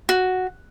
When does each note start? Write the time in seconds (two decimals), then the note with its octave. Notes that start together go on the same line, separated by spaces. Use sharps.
0.09 F#4